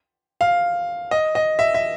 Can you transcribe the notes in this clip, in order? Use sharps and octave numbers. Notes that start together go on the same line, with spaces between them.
F5
D#5
D#5
E5
E5